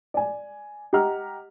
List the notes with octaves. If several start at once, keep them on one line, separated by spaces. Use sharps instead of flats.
D5 G#5
G4 D#5 F#5 A#5 F6